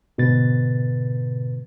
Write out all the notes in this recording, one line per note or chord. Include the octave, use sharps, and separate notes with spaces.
G#2 B2 D3 B4 A6